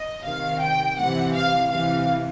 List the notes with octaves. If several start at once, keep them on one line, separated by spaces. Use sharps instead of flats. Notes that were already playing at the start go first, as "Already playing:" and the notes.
Already playing: D#5
C3 D#3 F5
G5
C3 E3 F#5
F5
C3 E3 F5